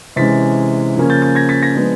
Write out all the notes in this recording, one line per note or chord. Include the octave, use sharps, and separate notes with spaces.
C3 E3 G#3 C#4 A6 B6
C#3 F3 A#3 C#4
G6 A6
G6 A6
G#6 A#6
A6 B6
G#6 A#6
F3 G#3 B3 D4